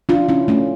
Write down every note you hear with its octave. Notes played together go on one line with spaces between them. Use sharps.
D4 F4
C#4 E4
A3 C#4